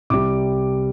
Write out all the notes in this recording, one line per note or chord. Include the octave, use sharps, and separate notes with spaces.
C2 C3 G3 D6